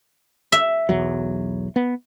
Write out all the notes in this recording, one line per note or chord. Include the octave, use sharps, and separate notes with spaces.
E5
B1 E2 F#3
B3